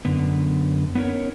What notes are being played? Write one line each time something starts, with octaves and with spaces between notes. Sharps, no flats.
F#2 D3 B3
B3 C#4 D#4 A#4 C#5